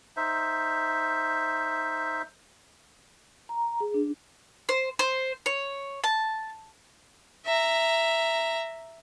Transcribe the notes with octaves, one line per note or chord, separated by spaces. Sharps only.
D#4 C5 E5
A#5
G#4
D4
C5
C5
C#5
A5
E5 A#5